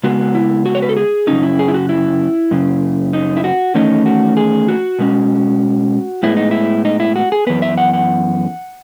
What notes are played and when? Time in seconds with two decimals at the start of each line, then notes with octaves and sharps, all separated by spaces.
0.04 C#3 G#3 B3 F#4
0.35 E4
0.66 F#4
0.75 C#5
0.82 B4
0.89 A4
0.97 G#4
1.27 F#2 C#3 F#3 C#4 D#4
1.43 E4
1.59 G#4
1.68 E4
1.74 F#4
1.89 E4
2.51 F#2 C#3
3.13 D#4
3.37 E4
3.44 F#4
3.75 E2 D#3 A3 C#4 D#4
4.06 F#4
4.37 G#4
4.68 F#4
4.99 B2 G#3 C#4
6.23 A2 G#3 B3 E4
6.37 D#4
6.51 E4
6.85 D#4
7.00 E4
7.16 F#4
7.32 G#4
7.47 F#2 E3 B3 B4
7.62 E5
7.78 F#5
7.93 F#5